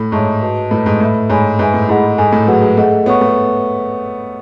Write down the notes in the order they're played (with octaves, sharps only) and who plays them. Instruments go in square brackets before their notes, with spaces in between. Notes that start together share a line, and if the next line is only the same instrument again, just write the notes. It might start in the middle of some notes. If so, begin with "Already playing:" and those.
Already playing: [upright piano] A2
[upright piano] G#2 [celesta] C#5 E5 A5 C#6
[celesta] F#4 B4 D#5 A5
[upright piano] A2 [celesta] E4 B4 D#5 A5
[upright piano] G#2
[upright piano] A2 [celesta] B4 E5 B5
[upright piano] G#2 [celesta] C#5 G#5 B5
[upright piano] G#2 [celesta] B4 E5 G#5
[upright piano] A2
[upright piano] G#2 [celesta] E4 G#4 D#5 F#5 B5
[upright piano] G#2 [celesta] A4 D#5 G#5
[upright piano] A2
[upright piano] F#3 [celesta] G#4 B4 F#5
[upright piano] G#3
[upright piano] A3 [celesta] G#4 D#5 F#5
[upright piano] B3 [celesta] C#5 F#5 C#6
[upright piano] A3